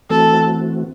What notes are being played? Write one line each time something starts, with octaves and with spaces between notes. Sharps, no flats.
E3 A3 C4 F#4 A4